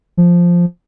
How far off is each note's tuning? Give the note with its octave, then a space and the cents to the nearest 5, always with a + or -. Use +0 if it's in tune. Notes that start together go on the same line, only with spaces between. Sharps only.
F3 +0